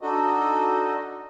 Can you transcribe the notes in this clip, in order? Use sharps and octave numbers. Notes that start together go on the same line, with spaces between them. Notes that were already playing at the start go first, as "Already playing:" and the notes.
D4 D#4 F#4 A4 D#5